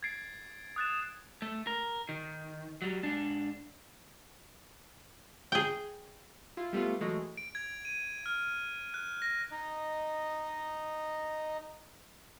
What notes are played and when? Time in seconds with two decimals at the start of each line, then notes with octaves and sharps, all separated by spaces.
0.03 G#6 A6 C7 D7
0.76 D#6 F#6 A6 E7
1.42 A3
1.67 A#4
2.09 D#3
2.82 F#3 G3
3.03 G#2 D4
5.52 G#4 G5
6.57 E4 F4
6.73 G3 A3 B3 F4
7.01 E3 F#3 G#3 A3
7.37 D7
7.55 G#6
7.85 D#7
8.26 F6
8.94 F#6
9.22 A#6
9.51 D#4 D#5